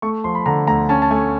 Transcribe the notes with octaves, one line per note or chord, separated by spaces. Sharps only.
A3 C#6
F3 C6
B5
D3 A#5
D2 A#5
C#4 A5
A5
A3 G#5